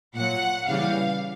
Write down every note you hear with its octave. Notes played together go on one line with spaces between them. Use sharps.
A#2 F#3 F#5
C#3 E3 G3 F5